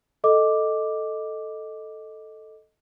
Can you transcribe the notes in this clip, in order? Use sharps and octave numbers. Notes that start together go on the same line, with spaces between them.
A4 D#5 D6